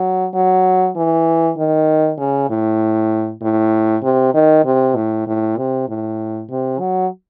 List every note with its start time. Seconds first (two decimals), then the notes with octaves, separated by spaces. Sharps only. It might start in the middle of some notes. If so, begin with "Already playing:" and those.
Already playing: F#3
0.34 F#3
0.96 E3
1.57 D#3
2.18 C#3
2.50 A2
3.41 A2
4.03 C3
4.34 D#3
4.65 C3
4.96 A2
5.27 A2
5.57 C3
5.88 A2
6.50 C3
6.80 F#3